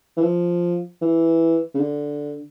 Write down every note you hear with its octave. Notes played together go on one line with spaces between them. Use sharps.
E3
F3
E3
C#3
D3